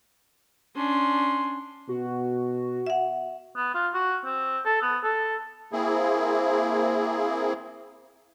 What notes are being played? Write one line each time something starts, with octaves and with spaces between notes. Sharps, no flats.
C#4 D4 C6
B2 F#4
E5 F#5
B3
F4
F#4
C4
A4
B3
A4
A#3 C4 E4 G#4